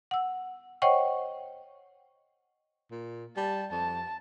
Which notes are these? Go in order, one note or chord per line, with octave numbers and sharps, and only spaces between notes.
F#5 E6
C5 C#5 D#5 F#5 G5 C#6
A#2
G3 A5
F2 A5